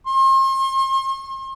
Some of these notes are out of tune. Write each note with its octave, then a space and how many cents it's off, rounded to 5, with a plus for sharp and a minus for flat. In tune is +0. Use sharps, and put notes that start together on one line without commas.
C6 +40